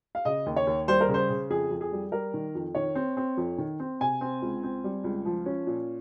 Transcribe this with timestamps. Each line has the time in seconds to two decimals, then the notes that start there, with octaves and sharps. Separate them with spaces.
0.15 F5
0.25 C#3 D#5
0.46 D#2
0.56 C#5
0.67 D#2
0.88 G3 C5
1.01 A#4
1.08 C#3
1.14 C5
1.30 C#3
1.50 F2 G#4
1.71 F2
1.81 G#4
1.92 G3
2.12 G3 A#4
2.34 D#3
2.55 F2
2.75 D#3 C#5
2.95 C4
3.17 C4
3.37 F2
3.58 D#3
3.80 C4
4.00 C3 G#5
4.21 C4
4.42 C#2
4.63 C4
4.84 G3
5.04 C#2
5.25 F3
5.46 C#4
5.67 A#2